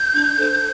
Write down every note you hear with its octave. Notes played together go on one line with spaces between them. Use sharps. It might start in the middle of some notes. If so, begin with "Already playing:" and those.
Already playing: G6
D4
A4 C5